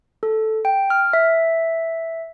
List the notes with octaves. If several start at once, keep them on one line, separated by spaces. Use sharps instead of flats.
A4
G5
F6
E5